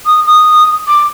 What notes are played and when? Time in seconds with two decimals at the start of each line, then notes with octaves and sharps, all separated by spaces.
0.06 D#6
0.26 D#6
0.88 D6